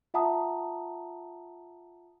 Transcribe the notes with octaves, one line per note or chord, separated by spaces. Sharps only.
F4 E5 F#5 A5 A#5 D#6